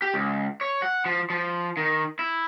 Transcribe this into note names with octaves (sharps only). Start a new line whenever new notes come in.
G4
C#2
C#5
F#5
F3
F3
D#3
E4